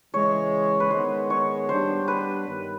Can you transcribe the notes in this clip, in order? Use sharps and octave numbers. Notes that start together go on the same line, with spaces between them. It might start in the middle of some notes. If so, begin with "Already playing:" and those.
C#3 E3 G#3 C#5
B4
D#3 G#3 B3 C5
C#5
G3 B3 D4 G4 C5
B4
G2 D#3